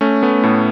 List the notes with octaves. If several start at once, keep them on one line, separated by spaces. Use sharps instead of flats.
A3 C#4
A3 B3
A2 A3